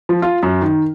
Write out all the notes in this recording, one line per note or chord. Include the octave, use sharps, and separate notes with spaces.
F3
F4
F#2
D#3